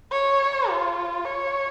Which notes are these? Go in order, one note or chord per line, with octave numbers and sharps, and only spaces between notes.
C#5
F4
C#5